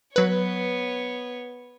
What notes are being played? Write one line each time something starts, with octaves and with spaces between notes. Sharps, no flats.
F#3 B3 B4 C#5